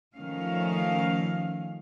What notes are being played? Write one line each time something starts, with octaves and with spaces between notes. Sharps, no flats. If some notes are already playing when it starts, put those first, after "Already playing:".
D#3 F3 A3 C#4 F5